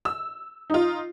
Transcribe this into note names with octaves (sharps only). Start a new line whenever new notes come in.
E6
D#4 F4